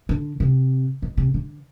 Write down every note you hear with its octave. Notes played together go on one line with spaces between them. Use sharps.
D3
C3
B2
C3
D3